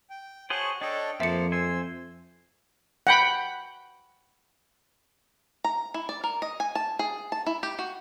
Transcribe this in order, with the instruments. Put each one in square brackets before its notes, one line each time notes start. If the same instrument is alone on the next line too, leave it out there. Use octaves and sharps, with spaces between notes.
[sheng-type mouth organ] G5
[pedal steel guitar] F#4 G#4 C5 [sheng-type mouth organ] C#5 A5 C#6
[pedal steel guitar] D4 A4 [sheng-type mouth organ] C#5 D#5 G5
[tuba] F2 [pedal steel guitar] F3 A#3 A5 [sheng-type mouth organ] C5 [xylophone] E5 C#7
[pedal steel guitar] C5 G#5 [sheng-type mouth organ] E6
[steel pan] F#5 G5 B5
[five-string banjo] A#5
E4
D5
A#4
D#5
G#5
A5
G#4
A5
E4
G4
F#4